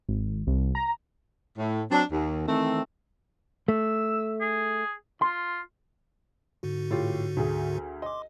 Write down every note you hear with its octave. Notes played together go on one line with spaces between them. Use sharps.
G#1
C2
A#5
A2
F#3 C4 D4
D#2
D#3 E3 A3 C4
A3 E6
G#4
F4 C6
G#2 D3 F#4
A2 F4 G4
D2 G#4
D#5 C6 D6